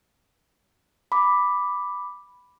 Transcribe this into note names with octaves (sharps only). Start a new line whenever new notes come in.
B5 D6